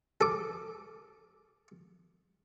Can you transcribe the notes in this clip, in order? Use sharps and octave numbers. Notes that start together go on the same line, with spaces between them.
A4 D6